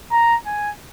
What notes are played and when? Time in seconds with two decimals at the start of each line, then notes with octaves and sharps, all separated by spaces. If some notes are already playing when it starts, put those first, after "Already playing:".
0.11 A#5
0.46 G#5